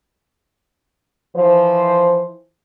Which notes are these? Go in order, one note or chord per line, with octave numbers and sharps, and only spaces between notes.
E3 F3 C5